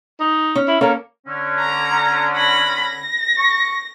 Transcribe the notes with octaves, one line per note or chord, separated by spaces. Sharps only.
D#4
C#4
E4
A#3 C#4 A4 A#4
D3 C#4
A#5
B5 A#6
A#6
C#6